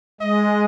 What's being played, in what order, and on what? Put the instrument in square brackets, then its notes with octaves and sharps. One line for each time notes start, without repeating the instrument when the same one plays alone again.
[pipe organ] G#3 [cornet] D#5